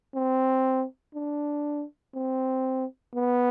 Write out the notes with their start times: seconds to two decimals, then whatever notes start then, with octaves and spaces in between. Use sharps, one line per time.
0.15 C4
1.15 D4
2.15 C4
3.15 B3